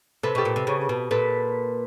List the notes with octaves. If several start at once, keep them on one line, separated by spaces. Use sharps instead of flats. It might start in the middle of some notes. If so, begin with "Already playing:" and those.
C3 A4 B4
B2 G4 A4
A#2
C3
C#3
B2
A#2 A4 B4